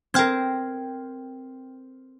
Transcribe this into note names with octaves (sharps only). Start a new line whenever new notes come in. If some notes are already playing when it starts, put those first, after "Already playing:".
C4 A#4 G5 F6 G#6